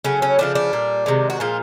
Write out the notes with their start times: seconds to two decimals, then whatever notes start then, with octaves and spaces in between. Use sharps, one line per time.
0.04 C#3 F#3 A3 C#4
0.22 C#4
0.39 C#3 F3 A3 D4
0.55 D4
0.73 A#2 G3
1.06 C3 D#3 G#3
1.30 F#4
1.40 A#2 F3 G#3 F4